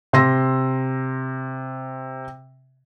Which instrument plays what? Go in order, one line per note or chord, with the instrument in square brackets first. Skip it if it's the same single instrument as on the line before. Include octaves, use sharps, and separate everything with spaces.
[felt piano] C3 C6 E6 A#6